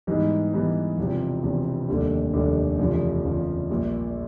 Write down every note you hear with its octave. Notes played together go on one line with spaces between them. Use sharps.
G#2 E3 G3 B3 D#4
G#2 E3 G3 B3 D#4
E1 E2 C3 F3
E1 E2 C3 F3
F1 D#2 D3 G3
F1 D#2 D3 G3
F1 E2 C#3 F3
F1 E2 C#3 F3
A#1 A#2 G3